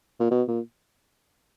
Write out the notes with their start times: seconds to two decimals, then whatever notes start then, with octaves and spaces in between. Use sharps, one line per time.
0.20 A#2
0.31 B2
0.48 A#2